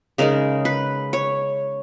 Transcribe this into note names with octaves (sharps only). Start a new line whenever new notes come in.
C#3 G#3 D#4 A#4
B4
C#5